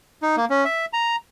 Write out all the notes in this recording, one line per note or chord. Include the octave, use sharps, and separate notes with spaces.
D#4
A#3
C#4
E5
A#5